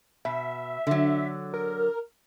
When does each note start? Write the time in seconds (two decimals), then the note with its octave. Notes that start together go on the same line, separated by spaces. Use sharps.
0.25 B2 E5
0.87 D3 F#3
1.54 A#4